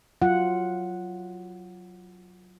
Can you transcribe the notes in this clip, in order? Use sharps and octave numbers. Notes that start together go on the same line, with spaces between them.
F#3 F4 F#5